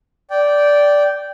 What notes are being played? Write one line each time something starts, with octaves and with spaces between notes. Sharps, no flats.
D5 G5